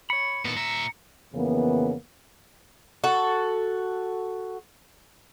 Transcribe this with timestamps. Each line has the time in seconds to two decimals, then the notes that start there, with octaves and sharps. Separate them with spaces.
0.10 C#5 B5 C#7
0.45 A#2 D#3 G#3 B3 A4
0.57 A#2 E5 A#5
1.34 F2 C#3 E3 A#3 B3
3.04 F#4 A4